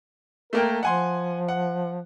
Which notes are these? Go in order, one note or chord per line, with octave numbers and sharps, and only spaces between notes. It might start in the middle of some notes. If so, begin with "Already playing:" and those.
A3 A#3 A#4 G5
F3 F#5 G#5 C6
F#5